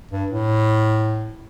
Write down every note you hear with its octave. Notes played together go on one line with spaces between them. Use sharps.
G2
A2